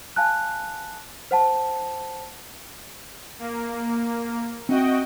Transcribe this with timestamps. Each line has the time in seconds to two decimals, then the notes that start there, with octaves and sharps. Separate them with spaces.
0.16 F5 G#5 A5 F#6
1.31 C5 F#5 A5
3.39 A#3
4.69 C4 F#4 D#5 E5 F#5 G5